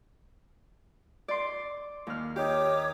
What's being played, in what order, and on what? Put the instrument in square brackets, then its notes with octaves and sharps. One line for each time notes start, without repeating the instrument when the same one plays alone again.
[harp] D5 C6
D#2 F6
[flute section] D#4 C#5 D6 [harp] G4